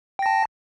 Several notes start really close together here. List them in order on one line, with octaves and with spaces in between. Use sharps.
G5 A#6 A5